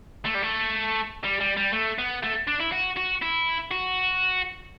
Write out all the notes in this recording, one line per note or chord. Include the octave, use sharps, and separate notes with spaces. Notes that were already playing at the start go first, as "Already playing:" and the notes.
A3
G3
A3
G3
G3
G3
A3
B3
A3
D4
E4
F#4
F#4
E4
F#4